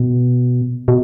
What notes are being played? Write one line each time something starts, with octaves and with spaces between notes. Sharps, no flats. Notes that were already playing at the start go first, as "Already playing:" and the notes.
Already playing: B2
B2